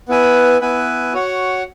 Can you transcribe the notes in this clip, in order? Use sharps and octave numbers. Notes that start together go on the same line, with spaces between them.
B3 E4 B4 G#5
B3 E4 B4 G#5
F#4 C#5 F#5